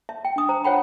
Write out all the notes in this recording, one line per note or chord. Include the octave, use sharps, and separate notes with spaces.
E5
G5
D4 D#6
C5 A#5
F4 C5 C#5 F#5 G5 B5